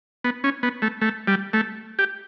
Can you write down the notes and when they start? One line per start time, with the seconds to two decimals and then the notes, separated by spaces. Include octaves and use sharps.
0.24 B3
0.44 C#4
0.63 B3
0.82 A3
1.01 A3
1.27 G3
1.53 A3
1.99 G4